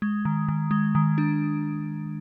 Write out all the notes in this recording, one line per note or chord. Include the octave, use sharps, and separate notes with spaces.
G#3
D#3
D#3
G#3
D#3
D4